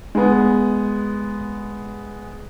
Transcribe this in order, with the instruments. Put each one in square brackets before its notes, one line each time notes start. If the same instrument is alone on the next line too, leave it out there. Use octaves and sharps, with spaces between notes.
[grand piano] G#3 B3